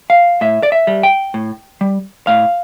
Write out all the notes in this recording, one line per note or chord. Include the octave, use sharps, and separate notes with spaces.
F5
A2 E5
D5
E5
G3
G5
A2
G3
A2 F5